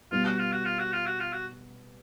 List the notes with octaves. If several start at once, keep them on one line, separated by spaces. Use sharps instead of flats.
B2 G3 B3 F4
F#4
F4
F#4
F4
F#4
F4
F#4
F4
F#4